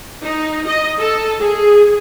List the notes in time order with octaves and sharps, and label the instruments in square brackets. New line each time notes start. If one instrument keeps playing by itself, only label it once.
[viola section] D#4
D#5
A4
G#4